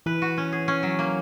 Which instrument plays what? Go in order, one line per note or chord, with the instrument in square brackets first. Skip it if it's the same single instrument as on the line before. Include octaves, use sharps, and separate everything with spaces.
[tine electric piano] E3 [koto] B4
[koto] F#4
C#4
G#4
C#4
F#3
A#3